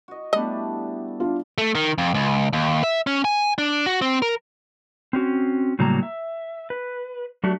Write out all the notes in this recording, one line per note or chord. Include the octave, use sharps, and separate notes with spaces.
F#4 D#5
G3 A3 B3 D4 E4 A4 D#5
D4 F4
A3
D#3
F2
C#2
D#2
E5
C#4
G#5
D4
F#4
C4
A#4
C4 C#4 F#4
A2 C#3 F#3 G3 A#3 A#5
E5
B4
F#3 A3 D4 F#4 G4